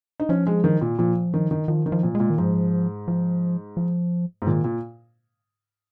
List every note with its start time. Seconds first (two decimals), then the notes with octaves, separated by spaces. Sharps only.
0.20 D#4
0.29 F3 C#4
0.47 G#3
0.64 D#3
0.81 A#2
0.99 A#2 F3
1.34 D#3
1.51 D#3
1.68 D#3 F3
1.86 D#3
1.92 F3
2.03 A#2
2.15 G#3
2.20 A#2
2.30 D#3
2.38 G#2 F3
3.08 F3
3.77 F3
4.42 G#2
4.47 A#2 D#3
4.64 A#2